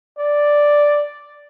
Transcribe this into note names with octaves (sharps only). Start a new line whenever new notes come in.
D5